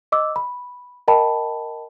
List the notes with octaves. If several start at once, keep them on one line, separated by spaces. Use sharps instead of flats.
D#5 D6 E6
B5
A#4 D#5 G5 A5 B5